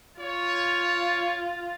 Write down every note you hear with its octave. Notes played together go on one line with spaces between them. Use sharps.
F4 C#5